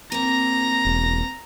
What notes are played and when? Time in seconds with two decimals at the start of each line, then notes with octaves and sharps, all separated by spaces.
0.12 A#3 C4 A#5 A#6
0.85 E1